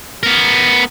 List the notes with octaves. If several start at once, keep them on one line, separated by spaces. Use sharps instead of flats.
B3 A#4